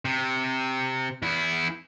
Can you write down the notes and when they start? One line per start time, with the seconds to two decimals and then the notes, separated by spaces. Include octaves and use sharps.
0.05 C3
1.22 E2 E4